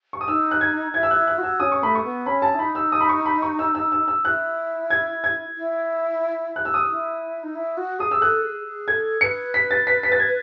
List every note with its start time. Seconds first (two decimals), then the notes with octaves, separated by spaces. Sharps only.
0.13 C#6
0.21 D#6
0.28 D#4 E6
0.51 F#6
0.61 G#6
0.94 E4 G#6
1.03 E6
1.11 F#6
1.16 E4
1.27 F#6
1.38 F#4
1.43 E6
1.60 C#4 D#6
1.72 C#6
1.83 A3 B5
1.95 C#6
2.04 B3
2.26 C#4 B5
2.42 A5
2.54 E4
2.59 D#4 B5
2.75 E6
2.92 D#6
3.01 B5
3.09 C#6
3.26 B5
3.42 C#6
3.59 E6
3.75 E6
3.92 E6
4.08 E6
4.24 E4 F#6
4.90 G#6
5.24 G#6
5.57 E4
6.56 F#6
6.65 E6
6.74 D#6
6.83 E6
6.89 E4
7.43 D#4
7.55 E4
7.77 F#4
7.99 G#4 D#6
8.11 E6
8.21 A4 F#6
8.44 G#4
8.65 G#4
8.88 A4 G#6
9.21 B4 C#7
9.54 B6
9.71 A6
9.87 B6
10.03 B6
10.12 A6
10.19 G#6